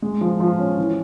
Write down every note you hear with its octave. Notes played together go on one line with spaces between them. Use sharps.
G#3
F3
F3
C#4
E3